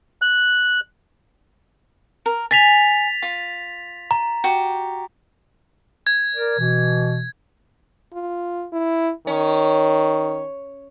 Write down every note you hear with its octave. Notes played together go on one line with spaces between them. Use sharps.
F#6
A#4
G#5 A6 B6 F7
F4
A#5
F#4 G4
G#6
A#4 D5
B2 E3
F4
E4
D#3 C#4